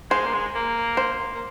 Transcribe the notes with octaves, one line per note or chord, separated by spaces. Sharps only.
G#3 C5
A#3
G#3
A#3
C5
A#3